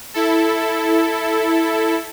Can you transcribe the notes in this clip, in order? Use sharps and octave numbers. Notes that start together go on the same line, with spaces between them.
E4 A4